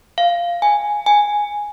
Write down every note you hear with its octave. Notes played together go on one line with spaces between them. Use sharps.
F5
G#5
G#5